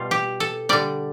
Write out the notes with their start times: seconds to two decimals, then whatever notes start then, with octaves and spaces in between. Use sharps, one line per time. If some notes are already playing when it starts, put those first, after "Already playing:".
Already playing: B2 G3 F4
0.11 G4
0.40 A4
0.69 D3 G3 D5